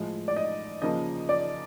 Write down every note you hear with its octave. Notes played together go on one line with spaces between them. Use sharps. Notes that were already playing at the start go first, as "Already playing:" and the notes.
Already playing: A2 F3 G#3
D5
D#5
C#3 F3 A#3 D#5
D5